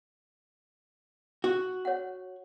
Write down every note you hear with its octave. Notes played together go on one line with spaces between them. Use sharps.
F#4
C#5 F#5